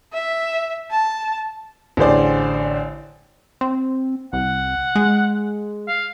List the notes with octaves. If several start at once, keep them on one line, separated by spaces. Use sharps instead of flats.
E5
A5
A1 D3 G#4 C5 D5
C4
C2 F#5
G#3
F5